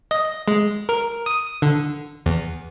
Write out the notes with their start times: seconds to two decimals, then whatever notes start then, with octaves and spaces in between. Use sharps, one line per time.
0.11 D#5
0.48 G#3
0.89 A#4
1.26 D#6
1.62 D3
2.26 E2